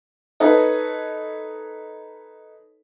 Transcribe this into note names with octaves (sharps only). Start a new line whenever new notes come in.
D#4 A4 B4 C#5 D#5